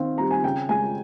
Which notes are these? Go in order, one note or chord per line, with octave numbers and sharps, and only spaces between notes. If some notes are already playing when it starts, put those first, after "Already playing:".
Already playing: D#3 C4 F5
G3 A#5
G#5
C#3 G5
G#3 G#5